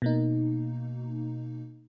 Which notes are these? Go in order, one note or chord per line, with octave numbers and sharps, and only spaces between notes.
B2 A#3 D#4